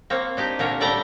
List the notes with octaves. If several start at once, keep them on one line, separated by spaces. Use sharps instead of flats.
A#3 C4 C#5
D4 D#4 G4
A#2 D3 A#4 C#5
A2 G3 A3 D5 G5 A#5